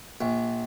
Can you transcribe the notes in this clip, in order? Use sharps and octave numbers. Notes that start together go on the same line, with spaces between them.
A#1